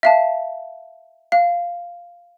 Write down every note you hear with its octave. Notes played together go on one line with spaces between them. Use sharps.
E5 F5 A5
F5